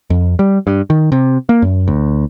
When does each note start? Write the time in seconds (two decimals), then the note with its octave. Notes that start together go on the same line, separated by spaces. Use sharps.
0.10 F2
0.39 G3
0.67 G2
0.90 D#3
1.12 C3
1.49 A#3
1.62 F#2
1.88 D2